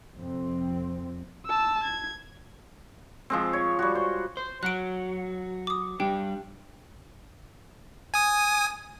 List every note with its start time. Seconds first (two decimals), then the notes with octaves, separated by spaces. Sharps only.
0.17 F2 C3 C4
1.46 A5 E6
1.84 G#6
3.30 F3 G#3 C4
3.53 C#5
3.79 G3 F#4
3.95 C5
4.37 C5
4.63 F#3 F#4 F#6 D7
5.67 D6 D#6
6.00 G3 D4 G4 G5
8.14 G#5 D#6